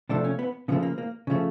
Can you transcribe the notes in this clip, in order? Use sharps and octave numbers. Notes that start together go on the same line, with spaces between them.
C3 F3 A3 D4
C#4
B3
C#3 F3 A3 B3
A#3
A#3
C#3 F3 A3